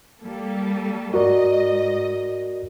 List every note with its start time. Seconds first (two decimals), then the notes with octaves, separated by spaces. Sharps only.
0.21 G3 A#3 A4
1.14 G#2 F#4 A#4 D5 D#5